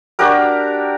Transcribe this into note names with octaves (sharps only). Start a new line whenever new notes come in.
D4 F#4 G4 A#4